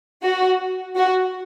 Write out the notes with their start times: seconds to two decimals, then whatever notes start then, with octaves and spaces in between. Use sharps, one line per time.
0.23 F#4
0.96 F#4